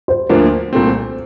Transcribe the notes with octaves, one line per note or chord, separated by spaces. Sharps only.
C5
D2 D3 F3 A#3 C5
C2 A#2 A3 C4